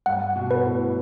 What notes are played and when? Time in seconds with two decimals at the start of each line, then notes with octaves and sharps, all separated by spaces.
0.06 G2 F#5
0.36 B2
0.51 B4
0.65 A2